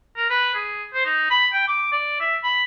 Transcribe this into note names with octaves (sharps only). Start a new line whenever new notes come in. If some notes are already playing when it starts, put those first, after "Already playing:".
A#4
B4
G#4
C5
D#4
B5
G5
D6
D5
E5
B5